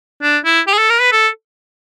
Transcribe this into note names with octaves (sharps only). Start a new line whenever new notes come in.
D4
E4
G4
G#4
A4
A#4
B4
A4